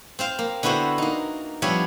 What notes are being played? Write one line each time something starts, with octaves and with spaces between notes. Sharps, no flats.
C4 C5 F5
A#3
D3 B3 E4 F#4 C5
A#3 D#4
F3 G3 B3 D4 C#5 E5